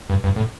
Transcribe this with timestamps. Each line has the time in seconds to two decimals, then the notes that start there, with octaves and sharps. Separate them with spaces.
0.10 G2
0.24 G2
0.36 A2